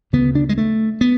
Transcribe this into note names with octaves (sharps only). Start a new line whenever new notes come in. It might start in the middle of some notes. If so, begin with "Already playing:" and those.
D2 C#3 B3
D4
G#3
A3
B3